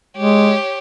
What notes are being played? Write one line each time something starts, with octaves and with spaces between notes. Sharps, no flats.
G#3 G4 C#5